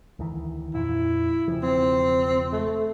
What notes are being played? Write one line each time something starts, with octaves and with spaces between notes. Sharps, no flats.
D2 D#3 E3
F2 A#2 E4
E1 C#3 F3
C4
A3